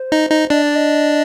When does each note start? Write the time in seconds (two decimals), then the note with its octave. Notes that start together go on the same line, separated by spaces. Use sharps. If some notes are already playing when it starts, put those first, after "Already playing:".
Already playing: C5
0.12 D#4
0.31 D#4
0.50 D4 D#5
0.62 D5
0.76 D#5